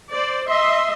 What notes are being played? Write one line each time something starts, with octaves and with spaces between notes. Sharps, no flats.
C5 D5
D#5 E5 C6